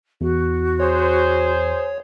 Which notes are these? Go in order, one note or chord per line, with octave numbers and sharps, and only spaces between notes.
E2 F#4
G#4 C5 C#5